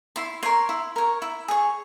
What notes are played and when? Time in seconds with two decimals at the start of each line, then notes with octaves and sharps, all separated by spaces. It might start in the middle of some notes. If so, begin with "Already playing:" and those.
0.16 E4 C6
0.43 A#4 C#5 C6
0.69 E4
0.96 A#4 C#5
1.22 E4
1.48 G#4 C#5